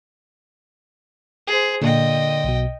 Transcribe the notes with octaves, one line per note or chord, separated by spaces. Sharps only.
G#4 C5
A#2 D3 D#5 G5
B1 B2